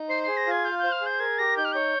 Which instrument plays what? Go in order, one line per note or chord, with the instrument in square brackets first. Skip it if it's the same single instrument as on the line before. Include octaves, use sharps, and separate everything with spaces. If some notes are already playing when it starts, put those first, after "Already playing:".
Already playing: [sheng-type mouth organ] D#4
[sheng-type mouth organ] C5 [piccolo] C7
[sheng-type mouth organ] G#4 [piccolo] C7
[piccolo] A#6
[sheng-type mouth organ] F4 [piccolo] G#6
[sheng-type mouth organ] F5 [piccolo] G6
[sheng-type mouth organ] C5 [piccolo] G6
[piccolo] F6
[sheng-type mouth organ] G#4
[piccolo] G6
[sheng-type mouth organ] A#4 [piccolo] G#6
[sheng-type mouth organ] G4 [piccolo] A#6
[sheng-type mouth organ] D#4 [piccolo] G6
[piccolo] F6
[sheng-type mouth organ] C#5 [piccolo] G6